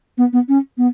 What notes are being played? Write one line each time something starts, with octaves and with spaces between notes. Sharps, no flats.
B3
B3
C#4
B3